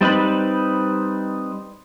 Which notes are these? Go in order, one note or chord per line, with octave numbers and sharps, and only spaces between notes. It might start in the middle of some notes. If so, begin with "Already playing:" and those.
G3 C4 D#4 B4 B5